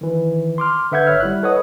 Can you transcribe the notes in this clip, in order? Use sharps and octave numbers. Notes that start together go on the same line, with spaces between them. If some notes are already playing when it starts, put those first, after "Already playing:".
D#3 E3
C6 D6 F6
D3 B4 E5 F#5 G6 G#6
G#1 C#5 E5 F6
G3 E4 F#6
A4 B4 C#5 D#5 F#5 D#6